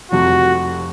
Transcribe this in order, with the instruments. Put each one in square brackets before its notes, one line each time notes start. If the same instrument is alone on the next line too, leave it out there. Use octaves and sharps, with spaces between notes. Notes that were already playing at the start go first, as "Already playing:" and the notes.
[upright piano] F1 F2 C3 F3 [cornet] F#4